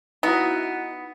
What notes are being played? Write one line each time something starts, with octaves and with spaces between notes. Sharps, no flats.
B3 D#4 E4 F#4